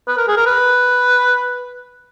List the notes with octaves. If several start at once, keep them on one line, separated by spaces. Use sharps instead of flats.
B4
A#4
G#4
A#4
B4